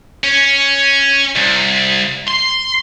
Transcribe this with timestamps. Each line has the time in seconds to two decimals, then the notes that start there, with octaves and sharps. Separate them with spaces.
0.24 C#4
1.36 C2
2.28 C6